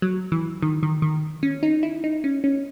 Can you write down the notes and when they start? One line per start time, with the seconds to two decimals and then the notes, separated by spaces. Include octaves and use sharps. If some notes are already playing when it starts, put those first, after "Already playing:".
0.02 F#3
0.32 E3
0.62 D#3
0.83 D#3
1.02 D#3
1.43 C#4
1.63 D#4
1.83 E4
2.04 D#4
2.24 C#4
2.44 C#4